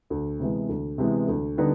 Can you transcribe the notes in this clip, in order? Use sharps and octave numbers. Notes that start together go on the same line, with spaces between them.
D2
C3 E3 G#3 B3
D2
C3 E3 G#3 B3
D2
D3 G3 B3 D#4